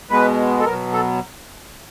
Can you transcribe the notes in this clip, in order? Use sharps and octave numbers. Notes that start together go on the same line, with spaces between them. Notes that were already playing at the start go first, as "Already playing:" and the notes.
B2 G#3 B3 B4
A4
B2 F#3 B3 A#4
A4